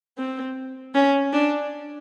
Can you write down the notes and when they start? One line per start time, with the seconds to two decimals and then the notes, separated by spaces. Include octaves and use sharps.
0.18 C4
0.95 C#4
1.33 D4